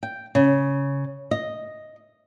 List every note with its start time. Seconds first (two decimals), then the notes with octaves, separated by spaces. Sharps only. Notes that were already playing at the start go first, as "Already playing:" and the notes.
0.03 G5
0.35 C#3
1.31 D#5